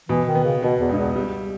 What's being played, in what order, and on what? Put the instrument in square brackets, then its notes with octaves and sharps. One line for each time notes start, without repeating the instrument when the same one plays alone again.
[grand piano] B2 [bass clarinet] E3
[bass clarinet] D#3
[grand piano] B3
[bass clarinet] C#3
[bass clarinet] B2 [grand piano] B3
[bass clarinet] E2
[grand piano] C#2 [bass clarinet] G2
[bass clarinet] E2
[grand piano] G3